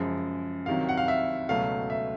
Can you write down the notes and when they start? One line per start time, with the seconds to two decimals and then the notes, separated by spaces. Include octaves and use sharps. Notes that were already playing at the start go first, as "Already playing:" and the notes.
Already playing: F#2 C#3 F3 G#3
0.66 C2 C3 D#3 F#3 F5
0.89 F#5
0.98 F5
1.08 E5
1.49 C#2 B2 F#3 A3 F5
1.90 E5